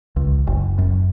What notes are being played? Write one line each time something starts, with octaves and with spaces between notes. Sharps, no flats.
C#2
F#1
F#2